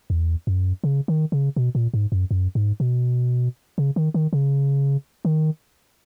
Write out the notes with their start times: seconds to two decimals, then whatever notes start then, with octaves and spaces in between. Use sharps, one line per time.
0.10 E2
0.47 F#2
0.84 C#3
1.08 D#3
1.32 C#3
1.56 B2
1.75 A#2
1.94 G#2
2.12 F#2
2.31 F#2
2.55 G#2
2.80 B2
3.78 C#3
3.96 D#3
4.14 D#3
4.33 C#3
5.25 D#3